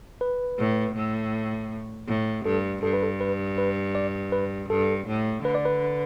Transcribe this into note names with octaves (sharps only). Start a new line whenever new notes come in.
B4
A2
A2
A2
G2 A4
G2 A4
B4
A4
B4
B4
D5
B4
G2 A4
A2
D3 B4
D5
B4